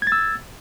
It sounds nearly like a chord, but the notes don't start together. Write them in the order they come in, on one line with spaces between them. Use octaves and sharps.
G#6 A6 E6